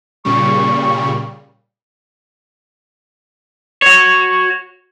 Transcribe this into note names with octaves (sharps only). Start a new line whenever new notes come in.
A#2 C#3 G3 C#6
F#4 C#5